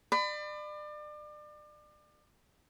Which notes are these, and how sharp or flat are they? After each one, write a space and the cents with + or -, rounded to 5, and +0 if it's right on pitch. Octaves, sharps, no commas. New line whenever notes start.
D5 +35 B5 +30